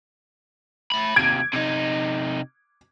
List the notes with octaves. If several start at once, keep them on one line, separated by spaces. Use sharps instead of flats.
A3 B5
D#2 C3 G#6 D7
C3 D#4